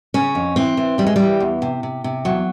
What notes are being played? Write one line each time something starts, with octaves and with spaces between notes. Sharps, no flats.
C#3 C#4
F2
E3 C4
E3
E3 G3
G#3
E3 G3
E2
C3
C3
C3
E2 F#3